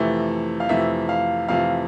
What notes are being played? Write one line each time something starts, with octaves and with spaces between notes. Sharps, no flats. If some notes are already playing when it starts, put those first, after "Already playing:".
Already playing: F2 C3 E3 A3
F5
F2 C3 E3 A3 E5
F5
F2 C3 E3 A3 F5